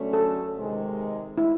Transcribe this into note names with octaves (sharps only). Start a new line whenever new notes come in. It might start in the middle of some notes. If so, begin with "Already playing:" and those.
Already playing: D3 F#3 A3 C#4
A4
C3 D#3 G#3
E4